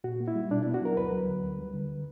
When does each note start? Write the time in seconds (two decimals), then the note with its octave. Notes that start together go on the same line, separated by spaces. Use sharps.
0.04 A#2 F#4
0.20 A#3
0.28 E4
0.35 G3
0.51 B2 D4
0.62 B3 E4
0.74 F#4
0.81 F#3 A#4
0.97 D2 B4
1.12 F#3
1.28 D3
1.43 D2
1.58 G3
1.74 D3